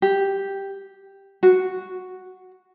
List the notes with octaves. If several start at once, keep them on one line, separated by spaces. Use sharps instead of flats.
G4
F#4